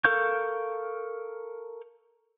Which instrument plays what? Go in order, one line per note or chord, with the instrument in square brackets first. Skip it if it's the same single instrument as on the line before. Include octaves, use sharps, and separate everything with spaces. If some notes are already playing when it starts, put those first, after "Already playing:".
[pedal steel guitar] A4 A#4 F5 C#6 G6